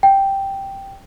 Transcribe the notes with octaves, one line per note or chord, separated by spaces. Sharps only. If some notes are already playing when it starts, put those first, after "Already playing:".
G5